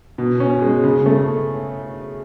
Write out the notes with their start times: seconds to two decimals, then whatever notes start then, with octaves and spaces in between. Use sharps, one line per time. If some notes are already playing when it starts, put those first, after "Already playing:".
0.18 B2
0.40 C#4
0.62 G#3
0.83 C#3
1.06 A3